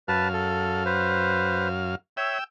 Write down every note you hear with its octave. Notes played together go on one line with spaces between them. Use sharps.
F#2 B4 F5 A5
A4
B4 C5
C#5 E5 G5 E6